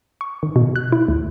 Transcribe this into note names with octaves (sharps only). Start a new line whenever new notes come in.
C#6
D#3
B2
F#6
E4
D2